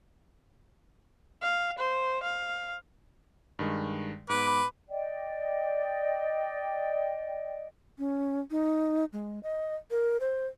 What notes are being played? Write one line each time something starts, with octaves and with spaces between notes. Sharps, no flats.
F5
C5
F5
G2 D#3 G#3
G#2 B3 B4 D6
D5 D#5 G5
C#4
D#4
G#3
D#5
A#4
C5